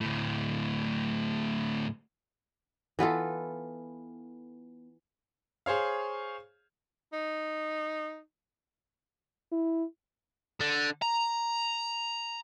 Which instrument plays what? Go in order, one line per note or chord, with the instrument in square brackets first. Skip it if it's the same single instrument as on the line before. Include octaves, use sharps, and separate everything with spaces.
[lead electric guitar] D2 A2
[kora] E3 B3 F4 A4
[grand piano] G#4 C5 C#5 F5
[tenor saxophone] D#4
[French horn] E4
[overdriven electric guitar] D3
A#5